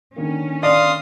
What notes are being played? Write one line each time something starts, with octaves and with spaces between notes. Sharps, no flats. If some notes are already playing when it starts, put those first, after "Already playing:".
D3 D#3 A#3 C#4
D5 F5 C6 D#6